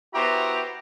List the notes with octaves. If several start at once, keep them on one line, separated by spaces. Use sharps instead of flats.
B3 E4 F#4 G4 C5 A#5